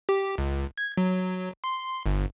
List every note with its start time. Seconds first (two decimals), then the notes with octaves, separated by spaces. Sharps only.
0.09 G4
0.38 C#2
0.78 G#6
0.97 F#3
1.64 C6
2.06 G1